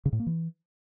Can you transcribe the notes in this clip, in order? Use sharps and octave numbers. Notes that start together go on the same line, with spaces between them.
C#3
A2
A#3
E3